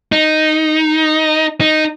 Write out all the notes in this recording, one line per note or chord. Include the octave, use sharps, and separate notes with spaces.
D#4
D#4